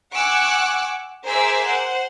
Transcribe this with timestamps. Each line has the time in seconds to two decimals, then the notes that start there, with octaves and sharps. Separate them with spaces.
0.15 F#5 G#5 C#6 D6 E6 F#6
1.26 G#4 A#4 C5 E5 D6 E6
1.67 C5 F#5